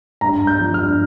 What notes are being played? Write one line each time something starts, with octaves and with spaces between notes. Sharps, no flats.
G2 A#5
G2
G6
F3
F6
G2